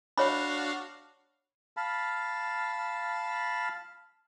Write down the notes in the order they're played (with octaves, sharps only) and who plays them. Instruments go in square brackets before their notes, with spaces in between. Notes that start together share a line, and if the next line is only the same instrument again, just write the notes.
[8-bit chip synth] D4 F#4 F5 [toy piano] C#5 B5
[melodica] F5 A5 B5